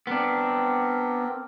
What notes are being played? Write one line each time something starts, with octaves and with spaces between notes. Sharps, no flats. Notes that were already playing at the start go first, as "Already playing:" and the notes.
B3 C4 D4 A#4